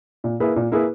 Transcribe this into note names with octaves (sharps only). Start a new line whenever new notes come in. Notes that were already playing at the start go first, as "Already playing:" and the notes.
A#2
A#3 E4 G#4 B4
A#2
A#3 E4 G#4 B4